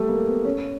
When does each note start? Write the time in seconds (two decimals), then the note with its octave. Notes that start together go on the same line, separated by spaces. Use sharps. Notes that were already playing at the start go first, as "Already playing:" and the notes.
Already playing: G3 A3
0.09 A#3
0.28 B3
0.45 C#4